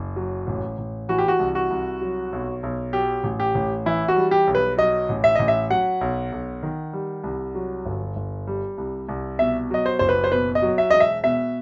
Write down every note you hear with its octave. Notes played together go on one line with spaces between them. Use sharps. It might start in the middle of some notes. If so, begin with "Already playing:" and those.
Already playing: F#1
F#3
A1
A1
E3 F#4
G4
F#4
C2
F#4
C2
F#3
B1
B1
F#3 G4
A1
G4
A1
E3 E4
F#4
G3
G4
B1
B4
F#3 D#5
A1
E5
A1 D#5
E5
F#3 F#5
B1
B1
D#3
G3
C2
F#3
G1
G1
G3
C2
C2
B2 E5
F#3 D#5
C5
F#1 C5
B4
C5
B2 B4
D#5
F#3
E5
E1 D#5
E5
B2 E5